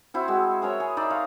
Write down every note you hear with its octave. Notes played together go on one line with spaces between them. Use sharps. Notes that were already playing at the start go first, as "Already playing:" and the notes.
C4 E4 F#4 C5
G#3 F#4
G#4 A#4 C#5 E5
G#4
D#4 D5 E5
C#5 F5 C6